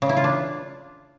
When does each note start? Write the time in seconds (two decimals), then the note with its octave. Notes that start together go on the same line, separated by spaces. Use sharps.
0.02 C#3
0.09 E4
0.17 F4
0.24 D4